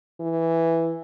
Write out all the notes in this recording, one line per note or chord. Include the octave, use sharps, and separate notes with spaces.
E3